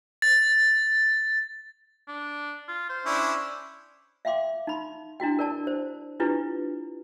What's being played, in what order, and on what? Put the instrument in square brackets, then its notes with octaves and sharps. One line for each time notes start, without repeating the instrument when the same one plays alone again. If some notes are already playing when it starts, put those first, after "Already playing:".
[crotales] A6
[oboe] D4
F4
C5
[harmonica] C#4 D4 E4
[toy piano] E5 F5 G5 C6 D6
D#4 B5 C6
D4 E4 F#4 G5
A#4 D5 A5
C5
D4 E4 F4 G4 B4